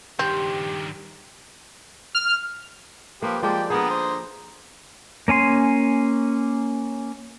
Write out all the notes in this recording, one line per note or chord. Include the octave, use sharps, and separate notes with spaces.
G2 D#3 C4 G4
F6
F3 A#3 G4 B4
F3 G#3 A#3 G4 D5 G5
D3 B3 G#4 A#4 A#5 D#6
C5
A#3 C#4 G#5 C6